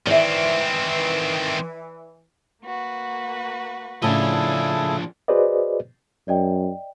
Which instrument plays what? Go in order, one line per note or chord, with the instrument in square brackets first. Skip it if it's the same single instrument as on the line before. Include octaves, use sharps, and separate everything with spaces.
[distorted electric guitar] D#3 C4 [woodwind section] E3 [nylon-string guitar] D5 E5
[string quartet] A#3 F#4 B4
[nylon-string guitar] A2 C#3 [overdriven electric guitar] F3 D4 [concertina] E4 G#4 A4
[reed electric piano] F#4 G#4 B4 C5 D5 D#5
[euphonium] F#2 [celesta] D5 D#5 G5